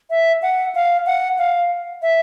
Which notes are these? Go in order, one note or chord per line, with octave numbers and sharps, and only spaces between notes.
E5
F#5
F5
F#5
F5
E5